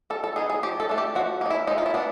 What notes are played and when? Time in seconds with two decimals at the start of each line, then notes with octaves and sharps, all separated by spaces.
0.10 G3 A4
0.24 A4
0.36 B3 D#4 G#4
0.50 G#4
0.63 F3 G4
0.80 A4
0.89 A3 D4
0.98 G4
1.15 F3 F#4
1.41 A#3 D#4
1.50 E4
1.67 G#3 D#4
1.78 F4
1.86 E4
1.94 B3 D4